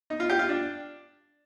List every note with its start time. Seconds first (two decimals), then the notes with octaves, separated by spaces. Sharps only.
0.10 D#4
0.20 F4
0.29 G4
0.39 F4
0.49 D4